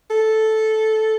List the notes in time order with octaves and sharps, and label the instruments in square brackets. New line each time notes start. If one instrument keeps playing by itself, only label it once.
[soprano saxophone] A4